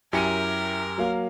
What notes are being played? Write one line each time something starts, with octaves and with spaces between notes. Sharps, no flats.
F#2 E4 G4 A#4 G#5 C#7 D#7
F#3 A#3 F5